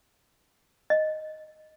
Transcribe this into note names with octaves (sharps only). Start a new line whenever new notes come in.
D#5